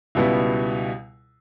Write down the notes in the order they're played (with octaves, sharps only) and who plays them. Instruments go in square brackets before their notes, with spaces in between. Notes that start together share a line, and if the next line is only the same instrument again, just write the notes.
[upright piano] C#2 B2 G3 B3 E4